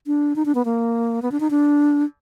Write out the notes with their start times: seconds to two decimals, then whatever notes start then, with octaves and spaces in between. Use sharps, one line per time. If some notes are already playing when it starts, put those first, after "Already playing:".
0.07 D4
0.36 D#4
0.45 D4
0.55 B3
0.65 A#3
1.22 B3
1.32 D4
1.40 D#4
1.51 D4